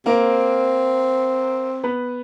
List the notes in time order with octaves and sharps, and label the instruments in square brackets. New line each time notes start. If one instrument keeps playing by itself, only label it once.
[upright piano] A#3 A#4 [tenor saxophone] C4
[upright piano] B3 B4